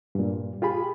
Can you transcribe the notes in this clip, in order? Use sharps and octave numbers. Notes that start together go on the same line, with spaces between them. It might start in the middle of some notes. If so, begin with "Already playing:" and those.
G2 A#2
F4 G4 G#4 B5